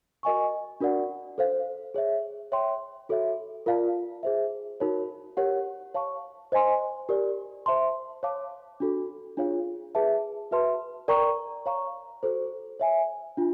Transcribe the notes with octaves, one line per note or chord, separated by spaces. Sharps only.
F#4 A#4 D#5 G#5 C#6
D4 F#4 A#4 D5 F#5
A4 C5 F5
G#4 C#5 E5
C#5 E5 G5 C6
F#4 A4 C#5 E5
F4 A#4 D5 F5 A5
G#4 C5 E5
D#4 F#4 A#4 C#5
G4 A#4 C#5 F#5
C#5 F5 A5 C#6
C5 D#5 G#5 C6
G4 A#4 D5
C5 E5 A5 C6
C#5 F5 A5 D6
D4 F#4 A4
D4 F4 G#4 C#5 F5
G#4 B4 E5 A5
F#4 B4 E5 A5 C6
A#4 D5 G5 A#5 C#6
C#5 F5 A#5 C#6
F#4 A4 C5
C#5 E5 G#5
D4 F4